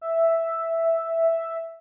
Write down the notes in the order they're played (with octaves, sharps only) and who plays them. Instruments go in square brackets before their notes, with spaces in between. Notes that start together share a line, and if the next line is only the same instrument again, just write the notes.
[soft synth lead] E5